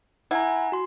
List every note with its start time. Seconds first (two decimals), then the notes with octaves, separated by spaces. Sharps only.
0.31 E4 F#5 G#5 A#5
0.72 F#4 C6